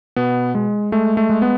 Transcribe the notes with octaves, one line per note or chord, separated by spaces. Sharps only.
B2 B3
G#3
G#3 A3
A3
G#3
B3